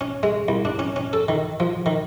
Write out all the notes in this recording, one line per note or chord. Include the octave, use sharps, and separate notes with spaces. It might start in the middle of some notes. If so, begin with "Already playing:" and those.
C#4
G#3
C2
D4
C#4
C#4
A4
D#3
F3
D#3